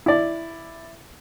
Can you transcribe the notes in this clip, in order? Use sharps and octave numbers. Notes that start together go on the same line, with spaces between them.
E4 D5